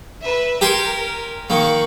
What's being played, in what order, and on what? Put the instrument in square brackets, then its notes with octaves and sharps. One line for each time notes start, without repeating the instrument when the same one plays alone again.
[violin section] B4 E5
[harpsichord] G4 G#5 C6 [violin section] A#4
[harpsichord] D#3 A#3 [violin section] C#6